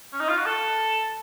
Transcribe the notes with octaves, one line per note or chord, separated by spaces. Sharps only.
C#4
D#4
F4
F#4
A4